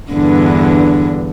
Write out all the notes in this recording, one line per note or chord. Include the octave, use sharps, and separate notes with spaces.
E2 G2 D3